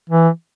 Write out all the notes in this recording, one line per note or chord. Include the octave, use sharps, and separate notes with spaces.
E3